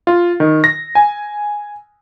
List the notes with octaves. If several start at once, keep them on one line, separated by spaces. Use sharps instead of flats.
F4
D#3
A#6
G#5